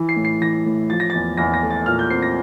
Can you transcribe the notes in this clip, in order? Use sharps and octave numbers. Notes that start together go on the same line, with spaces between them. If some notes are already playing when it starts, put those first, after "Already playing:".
Already playing: E3
C7
A2
C7
E3 A#6
A2
F3 A6
A#6
A6
E2
E2 A#6
A#6
A3
A6
A#2 F6
G6
C4 C7
A#6